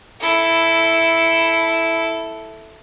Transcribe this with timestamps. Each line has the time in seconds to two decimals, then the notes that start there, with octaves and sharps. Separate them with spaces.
0.20 E4 A4